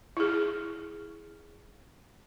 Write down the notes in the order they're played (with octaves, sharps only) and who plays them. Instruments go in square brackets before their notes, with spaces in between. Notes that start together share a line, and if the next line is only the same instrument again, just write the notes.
[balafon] E4 G#4